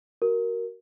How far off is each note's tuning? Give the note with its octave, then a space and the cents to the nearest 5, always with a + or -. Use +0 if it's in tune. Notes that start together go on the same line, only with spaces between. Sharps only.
F#4 +15 A#4 +0